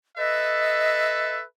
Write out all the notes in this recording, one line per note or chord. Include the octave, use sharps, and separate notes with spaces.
A4 B4 D#5 E5